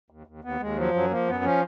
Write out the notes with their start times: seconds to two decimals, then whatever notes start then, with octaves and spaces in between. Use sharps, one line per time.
0.10 D#2
0.27 D#2
0.44 D#2 B3
0.60 D#2 G#3
0.77 F3 F#3
0.94 F#2 F#3
1.11 F3 A#3
1.27 F#2 B3
1.44 F3 C#4